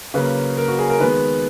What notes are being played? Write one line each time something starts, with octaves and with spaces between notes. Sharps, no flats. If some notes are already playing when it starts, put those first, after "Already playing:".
C#3 F#3 A#3 B4
A#4
F#4
G#4
A#4
D#3 G#3 B3 B4